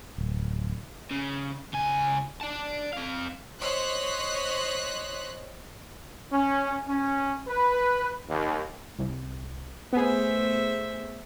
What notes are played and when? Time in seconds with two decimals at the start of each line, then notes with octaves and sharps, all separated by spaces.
0.18 D1
1.11 C#3
1.73 C#2 G#5
2.41 D5 A5
2.93 C4 F5
3.60 C5 C#5 D#5 C6 F#6 B6
6.32 C#4
6.88 C#4
7.47 B4
8.29 D#2
8.99 C2
9.93 A3 B3 G#4 C5 E5